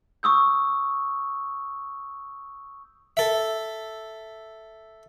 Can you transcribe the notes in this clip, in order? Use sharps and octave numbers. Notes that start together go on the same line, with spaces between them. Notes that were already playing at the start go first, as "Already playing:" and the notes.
C#6 D#6 E6 G6
A4 E5